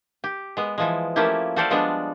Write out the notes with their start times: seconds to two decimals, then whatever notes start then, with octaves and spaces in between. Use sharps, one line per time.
0.24 G4
0.57 G#3 B3
0.78 E3 F3 G#3
1.16 F3 A3 A#3 C#4 E4 G4
1.56 F#4 G4 A4 C5 D5 F5
1.70 F3 G3 G#3 B3 D4